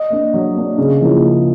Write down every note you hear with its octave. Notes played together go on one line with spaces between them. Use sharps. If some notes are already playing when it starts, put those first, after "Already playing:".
Already playing: D#5
A#3 D4
F#3
A#3 D4
C#3
F3 A#3 C#4 E4
C#3